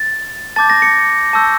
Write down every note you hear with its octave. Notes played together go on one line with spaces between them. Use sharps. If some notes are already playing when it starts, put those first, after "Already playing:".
Already playing: A6
A5 D6 G6 A6
A#6
C#7
A5 C#6 E6 G6